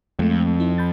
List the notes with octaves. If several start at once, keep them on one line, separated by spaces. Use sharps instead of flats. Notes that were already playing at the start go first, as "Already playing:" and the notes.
F2 G#3 A3
C4 D#4 E4
B5 G6 A6